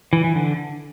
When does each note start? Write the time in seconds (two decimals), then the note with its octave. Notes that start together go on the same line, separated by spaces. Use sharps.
0.13 E3
0.24 E3
0.35 D3